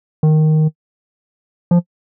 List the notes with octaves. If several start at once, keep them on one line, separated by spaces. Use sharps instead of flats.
D#3
F3